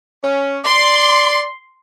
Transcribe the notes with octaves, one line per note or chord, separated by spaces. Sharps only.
C#4
D5 C6